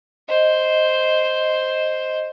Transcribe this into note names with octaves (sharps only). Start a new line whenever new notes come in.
C5 D#5